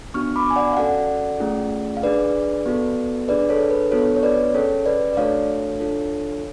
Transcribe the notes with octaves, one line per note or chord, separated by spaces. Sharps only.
B3 D4 F#4 C#6 F6
B5 D6
G#5
D5 F#5
F5
C#4 F#4 A4 D5 F#5
A3 C#4 F4 G#4
F5
D4 G#4 B4 D5
B3 F#4 A4
D4 G#4 B4 D5
A4 C#5
B4
B3 D4 F#4 A4 C#5
C#5
B4 D5
C#4 G#4 A4 C#5
B4 D5
D5
A3 D4 F#4 A4 C#5 F5
D4 F4 A4